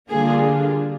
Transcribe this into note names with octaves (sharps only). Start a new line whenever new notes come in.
D3 G3 A#3 D4 F4 G#4